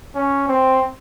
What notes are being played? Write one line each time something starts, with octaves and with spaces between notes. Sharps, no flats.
C#4
C4